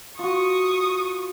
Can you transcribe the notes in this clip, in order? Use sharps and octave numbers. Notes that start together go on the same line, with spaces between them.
F4 F#4 C#6 D#6